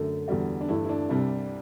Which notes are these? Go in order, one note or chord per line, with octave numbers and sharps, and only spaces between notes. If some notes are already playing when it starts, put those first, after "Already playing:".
Already playing: F#2 D3 A3
E2 D3 G3 F#4
D4
G2 E3 A3 E4
E4
D4
C2 C3 G3